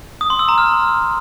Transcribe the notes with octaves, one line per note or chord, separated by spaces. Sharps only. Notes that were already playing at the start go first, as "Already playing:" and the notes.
D#6
C6
E6
A#5
F6